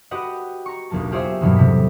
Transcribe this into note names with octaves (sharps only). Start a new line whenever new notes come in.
F#4 G4 B4 D#5 F#5
A#5 C#6
E1 B1 E3 A#3 A5
F4 G4 G#4 C5 C#5 E5
E2 G2 B2 E3 F#3 A#3
A2 C3 B6